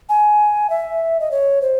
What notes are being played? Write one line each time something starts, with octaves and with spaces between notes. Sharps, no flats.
G#5
E5
D#5
C#5
C5